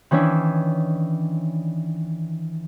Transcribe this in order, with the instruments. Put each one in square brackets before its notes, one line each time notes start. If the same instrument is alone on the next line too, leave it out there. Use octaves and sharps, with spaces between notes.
[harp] D#3 E3 C#4 D4 E4